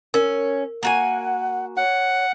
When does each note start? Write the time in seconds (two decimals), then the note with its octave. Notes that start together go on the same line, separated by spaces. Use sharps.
0.14 C#4 A#4
0.83 A#3 F#4 F#5 G#5
1.77 C#5 F#5